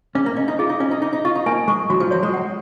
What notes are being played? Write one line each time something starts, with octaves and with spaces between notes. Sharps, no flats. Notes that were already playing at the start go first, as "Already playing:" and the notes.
C#4 G#4
A#3
C#4 D#5
D#4
F4 G#4
D#4
C#4 D#5
D#4
D#4 G#4
D#4
F4 C#6
D#4
A#3 G#5
G#3 C#6
F#3 F#4
F3
F#3 C#5
G#3
F#5